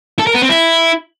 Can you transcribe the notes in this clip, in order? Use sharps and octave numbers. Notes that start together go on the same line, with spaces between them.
A4
A#4
B3
C4
E4